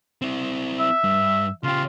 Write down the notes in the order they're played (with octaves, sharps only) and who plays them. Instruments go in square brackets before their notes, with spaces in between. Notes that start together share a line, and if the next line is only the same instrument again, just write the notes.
[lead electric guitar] C4 E4
[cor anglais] E5
[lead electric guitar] G2
[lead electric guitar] C#3 G4 [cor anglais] F4